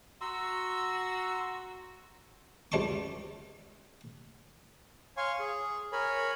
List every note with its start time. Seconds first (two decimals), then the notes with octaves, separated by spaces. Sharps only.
0.21 F#4 A#5 C6 E6
2.72 C#2 G3 A5 C6 C#6
5.17 C#5 F5 G#5 C6 C#6
5.40 G#4
5.92 A#4 C#5 G#5 B5